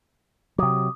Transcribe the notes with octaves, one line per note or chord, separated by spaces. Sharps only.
C3 F#3 D6 D#6